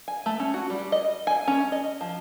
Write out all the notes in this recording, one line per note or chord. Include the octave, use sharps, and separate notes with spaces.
G#5
A3
C#4
F#4
G3
D#5
G#5
C#4
D#5
F3